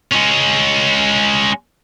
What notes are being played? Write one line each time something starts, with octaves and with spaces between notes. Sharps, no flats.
G#3 C#4